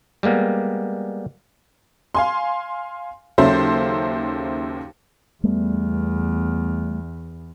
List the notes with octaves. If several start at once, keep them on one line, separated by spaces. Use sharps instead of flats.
G3 G#3 A#3 B3
F5 G#5 C6
D#2 C#3 F#3 A4 C5 E5
E2 G3 A3 B3